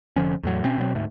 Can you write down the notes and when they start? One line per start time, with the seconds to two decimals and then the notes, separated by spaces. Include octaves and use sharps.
0.16 F1 D3 F3 C#4
0.43 E2 A2 F#3
0.64 B2 C4 C#4
0.78 B2 F#3 B3 C4
0.95 D2 G#2 A3